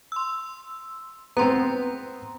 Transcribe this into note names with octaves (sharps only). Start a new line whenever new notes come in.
C6 E6
B3 C4 A#5 C6